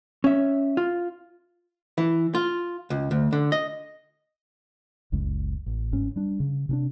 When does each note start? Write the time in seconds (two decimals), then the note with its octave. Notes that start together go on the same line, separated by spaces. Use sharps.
0.24 C#4 E5
0.77 F4
1.98 E3
2.35 F4
2.90 C#2
3.11 D2
3.33 D3
3.52 D#5
5.12 F#1 C#2 C#3 G#3
5.66 A1
5.92 G1 G#2 C#4
6.16 G3 D4
6.40 C#3
6.69 C3 C#4 D4